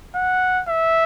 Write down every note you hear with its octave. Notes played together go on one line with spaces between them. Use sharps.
F#5
E5